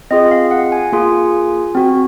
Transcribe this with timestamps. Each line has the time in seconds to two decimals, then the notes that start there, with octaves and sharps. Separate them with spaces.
0.11 C4 F4 G#4 D#5
0.31 F5
0.51 F#5
0.72 G#5
0.92 A#3 F4 G#4
1.75 C4 F#4